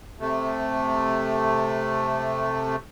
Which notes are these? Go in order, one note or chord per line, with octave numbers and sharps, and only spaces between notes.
C3 A3